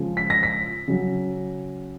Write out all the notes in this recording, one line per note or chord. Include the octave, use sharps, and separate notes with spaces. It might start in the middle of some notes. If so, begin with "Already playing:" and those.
Already playing: C#3 F3 G#3
B6
A#6
B6
C#3 F#3